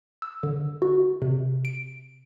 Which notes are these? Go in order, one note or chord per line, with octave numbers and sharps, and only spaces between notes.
E6
D3
F#4
C3
D7